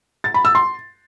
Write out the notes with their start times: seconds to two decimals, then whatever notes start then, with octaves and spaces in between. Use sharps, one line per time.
0.24 A6
0.34 B5
0.45 E6
0.55 C6